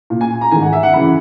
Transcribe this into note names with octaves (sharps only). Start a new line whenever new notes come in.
A#2
G#5
A#5
G#2 D#3 G#5
F#5
E5
F#5
F#2 C#3 E3 B5